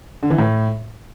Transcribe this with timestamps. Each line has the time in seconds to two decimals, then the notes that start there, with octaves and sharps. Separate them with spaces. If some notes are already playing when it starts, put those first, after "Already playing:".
0.23 D3
0.30 E3
0.38 A2